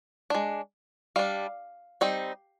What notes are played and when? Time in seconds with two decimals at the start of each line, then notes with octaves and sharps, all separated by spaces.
0.30 G#3 D4
1.16 G3 D4 F5
2.01 G3 C4 D#4